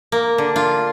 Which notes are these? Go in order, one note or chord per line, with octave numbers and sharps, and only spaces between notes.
A#3
D3
F4